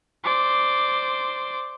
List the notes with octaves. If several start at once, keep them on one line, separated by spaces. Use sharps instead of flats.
C5 D5